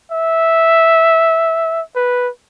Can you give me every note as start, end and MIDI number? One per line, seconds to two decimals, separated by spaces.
0.12 1.81 76
1.96 2.29 71